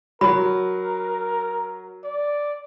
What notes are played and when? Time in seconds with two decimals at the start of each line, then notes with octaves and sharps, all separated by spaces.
0.21 F#3 A#4 B5
2.04 D5